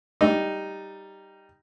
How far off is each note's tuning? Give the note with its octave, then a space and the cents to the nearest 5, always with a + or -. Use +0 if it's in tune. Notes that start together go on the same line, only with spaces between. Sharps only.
G3 +0 D#4 +0